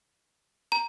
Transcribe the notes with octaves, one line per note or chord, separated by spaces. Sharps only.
A#5